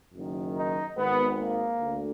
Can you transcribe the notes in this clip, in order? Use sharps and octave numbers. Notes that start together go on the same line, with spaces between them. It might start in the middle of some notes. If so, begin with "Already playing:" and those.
F#1 F#2 D#3
D#4
G#1 G#2 D#3 B3
A#3
D2 D3